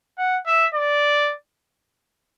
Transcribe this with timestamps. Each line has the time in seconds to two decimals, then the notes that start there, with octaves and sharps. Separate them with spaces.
0.18 F#5
0.46 E5
0.75 D5